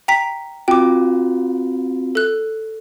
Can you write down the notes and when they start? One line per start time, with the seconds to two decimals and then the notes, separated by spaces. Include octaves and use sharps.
0.08 G5 A#5 B6
0.68 C4 F4 F#4 G5 D6
2.15 A4 F#6